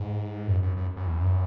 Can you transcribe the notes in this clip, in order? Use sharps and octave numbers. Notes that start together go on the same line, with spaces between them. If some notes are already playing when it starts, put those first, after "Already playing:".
Already playing: G#2
F#2
F#2
F#2
F#2
E2
F#2